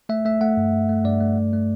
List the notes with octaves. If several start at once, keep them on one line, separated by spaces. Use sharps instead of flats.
A3 E5
A3 E5
A3 F#5
G2
G2
A3
G2 D5
A3
G2
A3